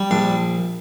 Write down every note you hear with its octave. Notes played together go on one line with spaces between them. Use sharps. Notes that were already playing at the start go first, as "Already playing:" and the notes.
Already playing: G3
A#1 D4